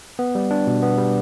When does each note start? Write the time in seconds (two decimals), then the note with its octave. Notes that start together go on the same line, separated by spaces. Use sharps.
0.19 B3
0.35 G3
0.51 D4
0.67 B2
0.83 B3
0.98 G3